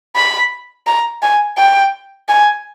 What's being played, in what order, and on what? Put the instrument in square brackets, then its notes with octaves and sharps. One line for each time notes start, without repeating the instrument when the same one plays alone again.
[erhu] B5
A#5
G#5
G5
G#5